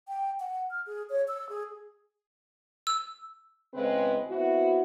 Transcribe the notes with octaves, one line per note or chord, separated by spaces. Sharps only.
G5
F#5
F6
G#4
C#5
E6
G#4
E6
E2 C#3 G#3 C4 G#4 B4
B3 C4 E4 F#4